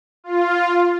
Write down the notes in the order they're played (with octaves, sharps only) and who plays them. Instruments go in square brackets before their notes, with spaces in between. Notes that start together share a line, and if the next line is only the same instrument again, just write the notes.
[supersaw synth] F4